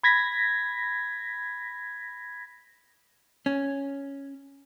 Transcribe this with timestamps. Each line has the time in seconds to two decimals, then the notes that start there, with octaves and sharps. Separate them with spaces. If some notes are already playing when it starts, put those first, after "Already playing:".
0.04 B5 G#6 A#6 B6
3.46 C#4